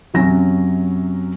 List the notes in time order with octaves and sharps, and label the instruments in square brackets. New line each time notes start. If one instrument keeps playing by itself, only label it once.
[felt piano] F#2 C3 F#3 C#4 A#6